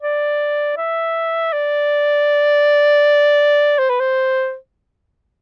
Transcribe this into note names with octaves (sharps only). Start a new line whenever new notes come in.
D5
E5
D5
C5
B4
C5